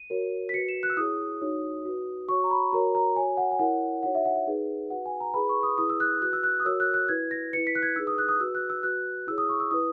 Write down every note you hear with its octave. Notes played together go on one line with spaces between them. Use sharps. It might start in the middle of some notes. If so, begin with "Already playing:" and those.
Already playing: D#7
F#4 A#4 C#5
B6
F#4 B4 C#7
E7
F#6
E6
E4 G#4 C#5 D#6
D#4 F#4 C#5
F#4 B4
F#4 C#5 C#6
A#5
B5
F#4 A#4 C#5 A#5
A#5
F#4 C#5 G#5
F#5
G#5
E4 A#4 C#5 F#5
D#4 F#4 C#5 F#5
E5
F#5
E5
D#4 G#4 B4
F#4 B4 F#5
G#5
A#5
E4 G#4 B4 B5
C#6
D#6
E4 G#4 B4 D#6
E6
F#6
F#4 B4 F#6
E6
F#6
D#6
F#4 A#4 C#5 E6
F#6
F#6
E4 B4 G#6
A#6
E4 B4 C#7
B6
F#6
G#6
D#4 G#4 B4 E6
D#6
F#6
D#6
F#4 B4 E6
F#6
E6
F#4 B4 F#6
E4 G#4 C#5 E6
D#6
C#6
E6
E4 B4 D#6